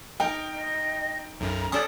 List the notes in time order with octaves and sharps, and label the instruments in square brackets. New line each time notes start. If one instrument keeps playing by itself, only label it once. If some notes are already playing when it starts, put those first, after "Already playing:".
[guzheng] D#4 A#4 [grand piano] G5
[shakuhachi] D#5
[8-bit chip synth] B1 F#2 [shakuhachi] A#5
[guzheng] C#4 A4 [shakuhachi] D5 [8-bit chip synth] D#6